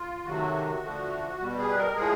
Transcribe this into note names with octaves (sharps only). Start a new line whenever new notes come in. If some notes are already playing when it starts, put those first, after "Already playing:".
Already playing: F4
C3 D#3 F#3 A3 F#4
D3 F3 A3
B2 G3
G#4
B4
A#4
A2 F3 G#3 G#4